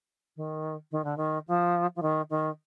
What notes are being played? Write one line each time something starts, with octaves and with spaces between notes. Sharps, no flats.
D#3
D#3
D3
D#3
F3
F3
D#3
D#3